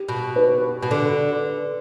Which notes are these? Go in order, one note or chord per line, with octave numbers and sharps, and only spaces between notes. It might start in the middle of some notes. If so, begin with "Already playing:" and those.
Already playing: G4
B2
B4
B2
D3